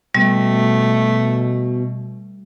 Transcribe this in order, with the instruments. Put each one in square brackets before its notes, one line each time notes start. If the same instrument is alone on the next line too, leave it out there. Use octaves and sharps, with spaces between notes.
[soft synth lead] B2 [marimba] G3 [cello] A3